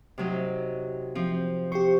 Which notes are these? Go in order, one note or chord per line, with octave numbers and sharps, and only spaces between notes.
C3 F#3 D#4
F3 C4
G4 C5 C#6